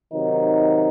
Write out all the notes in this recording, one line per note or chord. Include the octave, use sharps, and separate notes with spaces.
C3 D#3 F#3 D#4